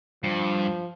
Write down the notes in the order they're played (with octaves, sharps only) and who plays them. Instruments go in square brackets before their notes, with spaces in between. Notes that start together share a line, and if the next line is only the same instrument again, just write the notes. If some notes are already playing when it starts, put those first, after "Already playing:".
[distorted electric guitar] G2 [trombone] F3